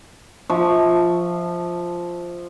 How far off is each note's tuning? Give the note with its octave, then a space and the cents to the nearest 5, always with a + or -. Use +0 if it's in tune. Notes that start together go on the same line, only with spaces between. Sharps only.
F3 +0 E5 -35 C#6 +0